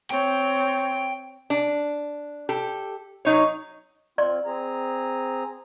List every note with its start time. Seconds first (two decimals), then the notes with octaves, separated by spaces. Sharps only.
0.11 C4 C#5 G5
1.50 D4
2.49 G4 A4
3.25 F#3 D#4 C#5
4.18 C4 F4 D5 C6
4.45 C4 G#4 A#5